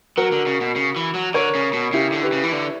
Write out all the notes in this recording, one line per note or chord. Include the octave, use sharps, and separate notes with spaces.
F#3 F#4 A#4
D3
C#3
B2
C#3
E3
F#3
D3 A#4 C#5
C#3
B2
C#3 E4 G4
D3
G4 B4
C#3
E3
D3